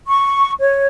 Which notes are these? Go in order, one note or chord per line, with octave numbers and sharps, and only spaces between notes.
C#6
C#5